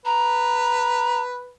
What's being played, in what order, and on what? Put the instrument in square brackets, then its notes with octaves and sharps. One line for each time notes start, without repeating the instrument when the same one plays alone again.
[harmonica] B4 [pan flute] A#5